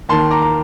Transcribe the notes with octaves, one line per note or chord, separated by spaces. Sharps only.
D#2 D#3 A5 C6
A#5 D6
A#5